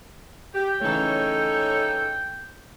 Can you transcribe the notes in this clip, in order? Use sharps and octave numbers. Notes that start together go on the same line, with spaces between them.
G4 G5
C#3 E3 A3 D#4 A4 C#5